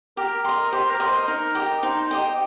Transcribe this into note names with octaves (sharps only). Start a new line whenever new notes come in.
G4 A#4
D#5 C6
G4 C5
A#4
D#5 C6
C5
D#4 A#4
G4 D#5 G5
D#4 C5
G4 D#5 G5